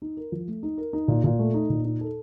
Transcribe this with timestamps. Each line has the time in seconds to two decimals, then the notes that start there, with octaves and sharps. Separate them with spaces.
0.02 D#4
0.17 A#4
0.32 F3
0.48 A3
0.63 D#4
0.78 A#4
0.93 D#4
1.08 A#2
1.24 A#2
1.39 A3
1.54 D#4
1.70 A#2
1.85 D#4
2.01 A4